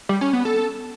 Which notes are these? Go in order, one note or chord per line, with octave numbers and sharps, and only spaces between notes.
G3
C#4
B3
A4